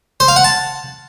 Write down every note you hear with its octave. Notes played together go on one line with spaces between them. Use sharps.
C5
F5
F#5
A5